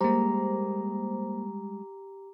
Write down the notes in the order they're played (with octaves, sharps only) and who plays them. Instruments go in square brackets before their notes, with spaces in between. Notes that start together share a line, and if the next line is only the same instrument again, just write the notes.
[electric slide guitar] G3 G#3 [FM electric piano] A#3 C5 [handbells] G4 A#5